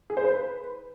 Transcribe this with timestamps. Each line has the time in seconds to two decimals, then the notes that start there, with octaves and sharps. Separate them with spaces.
0.10 G#4
0.17 C5
0.24 B4